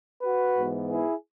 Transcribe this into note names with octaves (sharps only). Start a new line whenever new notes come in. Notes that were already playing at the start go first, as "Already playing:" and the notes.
F#4 B4
G#2 E3 B3
E4 G#4